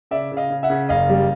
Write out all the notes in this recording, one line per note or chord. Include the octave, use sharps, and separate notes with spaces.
C#3 D5 E5
C#3
D#5 F5
C#3
E5 F#5
C#3
F#1 D#5 F5
G3